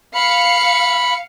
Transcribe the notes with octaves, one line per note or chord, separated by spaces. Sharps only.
F5 B5 C#7